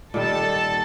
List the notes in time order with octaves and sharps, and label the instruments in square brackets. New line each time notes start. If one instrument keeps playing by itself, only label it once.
[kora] A#2 D#3 G3 [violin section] A4 A5